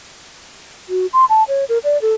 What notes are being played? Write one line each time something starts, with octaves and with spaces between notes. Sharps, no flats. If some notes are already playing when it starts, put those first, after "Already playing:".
F#4
C6
A5
C#5
A#4
D5
A4